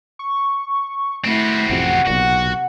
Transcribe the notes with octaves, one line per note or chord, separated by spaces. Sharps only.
C#6
A3 C4 E4 F#4
A1 F2 C3 F#5
B1 A#2 F#4